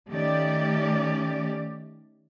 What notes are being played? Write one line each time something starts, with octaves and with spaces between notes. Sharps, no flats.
D#3 A3 C#4 G4 D5